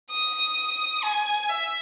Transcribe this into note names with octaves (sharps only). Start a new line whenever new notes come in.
D#6
G#5
E5